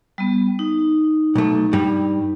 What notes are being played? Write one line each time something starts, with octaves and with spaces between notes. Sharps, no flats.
G3 B3
D#4
B1 A3
G2 G3